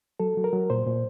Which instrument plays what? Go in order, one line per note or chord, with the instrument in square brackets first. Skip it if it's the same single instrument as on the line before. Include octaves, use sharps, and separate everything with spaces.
[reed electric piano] F#3 A4
F#3
A#4
F#3
A#2 C5
A#2